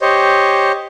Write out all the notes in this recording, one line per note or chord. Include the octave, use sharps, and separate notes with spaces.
G4 C5 C#5 D#5